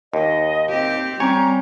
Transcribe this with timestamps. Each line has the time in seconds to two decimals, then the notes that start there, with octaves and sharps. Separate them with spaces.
0.14 D#2 D#5
0.69 C4 G4
1.20 G3 C4 C#4 C#5 G#5 A#5